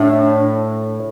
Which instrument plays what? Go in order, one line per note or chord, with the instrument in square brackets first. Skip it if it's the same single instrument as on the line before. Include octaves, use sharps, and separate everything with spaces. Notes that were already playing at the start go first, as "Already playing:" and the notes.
Already playing: [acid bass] A2 [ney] D4